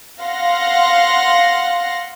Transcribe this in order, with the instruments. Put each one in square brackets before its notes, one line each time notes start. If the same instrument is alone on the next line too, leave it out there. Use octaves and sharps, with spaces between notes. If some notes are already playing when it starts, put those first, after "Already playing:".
[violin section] F5 F#5 C6 A#6